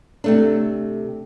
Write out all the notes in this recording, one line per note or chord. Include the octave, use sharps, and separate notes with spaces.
C3 A3 D4